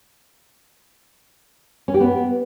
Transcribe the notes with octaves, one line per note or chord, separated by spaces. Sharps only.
C#4
G4
B3